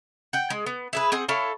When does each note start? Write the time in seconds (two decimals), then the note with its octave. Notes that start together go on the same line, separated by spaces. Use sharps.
0.33 F#5 G5
0.50 G#3
0.66 B3
0.93 E4 G#4 B4
1.12 C4 G#4 F#5
1.28 E4 A4 C#5 F5